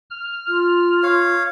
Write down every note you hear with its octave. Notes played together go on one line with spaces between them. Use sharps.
F6
F4
C#5 F5